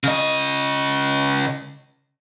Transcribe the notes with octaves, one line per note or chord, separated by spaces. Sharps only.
C#3 D#5